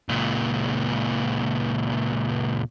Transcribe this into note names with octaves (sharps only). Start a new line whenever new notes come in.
C#2 A#2